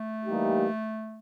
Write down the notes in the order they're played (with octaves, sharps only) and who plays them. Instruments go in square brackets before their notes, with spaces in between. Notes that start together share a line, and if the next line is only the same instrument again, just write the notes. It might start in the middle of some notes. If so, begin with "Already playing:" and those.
Already playing: [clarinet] A3
[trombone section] E3 G3 A#3 D#4 G4